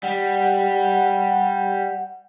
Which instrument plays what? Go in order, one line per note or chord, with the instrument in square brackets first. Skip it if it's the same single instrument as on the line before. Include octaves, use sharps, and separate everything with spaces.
[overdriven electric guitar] G3 [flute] F#5